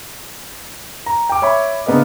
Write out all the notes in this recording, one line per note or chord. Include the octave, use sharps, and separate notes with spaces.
A#5
G5 D6
C#5 E5 B5 C#6
C#3 A#3 B3 D4 A#4 D#5